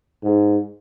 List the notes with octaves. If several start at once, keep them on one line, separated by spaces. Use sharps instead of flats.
G#2